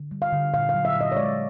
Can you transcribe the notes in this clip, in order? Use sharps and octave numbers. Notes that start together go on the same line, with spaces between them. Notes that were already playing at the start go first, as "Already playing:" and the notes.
Already playing: D3
G3
F5
D3
A#2 F5
F5
F#3
E5
A#2
D#5
C#5
G#3 D5